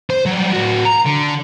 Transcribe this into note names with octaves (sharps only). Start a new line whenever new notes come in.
C5
F#3 G3
A2 F#4
A#5
D3